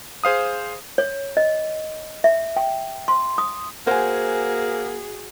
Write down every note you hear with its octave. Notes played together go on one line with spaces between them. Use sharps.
G#4 C5 F5 D#6
C#5
D#5
E5
G5
C6
D#6
A#3 F#4 G#4 C5 F#5 G#5